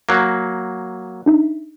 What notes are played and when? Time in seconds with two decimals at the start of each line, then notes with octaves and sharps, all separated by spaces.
0.09 F#3 A#3
1.26 D4 D#4 E5